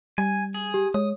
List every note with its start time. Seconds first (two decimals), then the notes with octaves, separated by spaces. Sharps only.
0.18 G3 G#5
0.54 G#4
0.74 G4
0.94 G#3 C#5 D#6